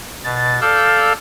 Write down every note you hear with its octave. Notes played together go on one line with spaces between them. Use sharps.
B2 A6
A4 D5 F5 E6 F6 G6